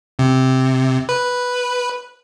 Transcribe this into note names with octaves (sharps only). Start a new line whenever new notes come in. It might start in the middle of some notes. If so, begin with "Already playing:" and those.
C3
B4